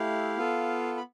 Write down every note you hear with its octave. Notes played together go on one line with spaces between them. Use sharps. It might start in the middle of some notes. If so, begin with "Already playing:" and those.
Already playing: A3 E4 G4 F5
B3 F4 A4
B5